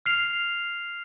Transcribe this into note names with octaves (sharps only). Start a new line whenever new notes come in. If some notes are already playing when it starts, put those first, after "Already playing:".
F6 C7 F7